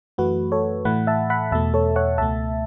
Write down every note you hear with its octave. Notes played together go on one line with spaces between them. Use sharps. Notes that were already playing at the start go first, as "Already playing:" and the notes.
F#2 E3 A3 F#4 B4
A4 C#5
A2 E3 A3 F#5 B5
E5 A5
F#5 B5
E2 B2 A3 E5 A5
A4 C#5
C#5 F#5
C#2 B2 A3 E5 A5